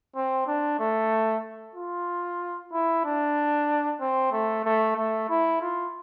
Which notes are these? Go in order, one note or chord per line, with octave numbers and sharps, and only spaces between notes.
C4
D4
A3
F4
E4
D4
C4
A3
A3
A3
E4
F4